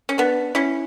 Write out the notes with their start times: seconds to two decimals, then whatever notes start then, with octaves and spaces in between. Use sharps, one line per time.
0.09 C#4
0.18 B3 D4
0.55 C#4 E4